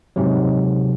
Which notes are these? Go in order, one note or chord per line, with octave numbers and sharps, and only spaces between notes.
G#2 C3 F#3